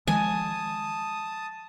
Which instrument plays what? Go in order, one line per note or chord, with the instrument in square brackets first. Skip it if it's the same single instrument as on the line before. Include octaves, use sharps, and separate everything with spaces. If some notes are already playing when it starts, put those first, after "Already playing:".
[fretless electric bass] D#3 F3 G#3 [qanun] G#5 [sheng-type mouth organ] A5 D#6